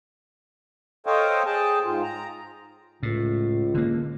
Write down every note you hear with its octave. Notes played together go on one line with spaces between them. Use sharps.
A4 C5 C#5 D#5 F5 G5
G#4 G5 A5
G#2 F4
A#5
C#2 A2
D3 A#3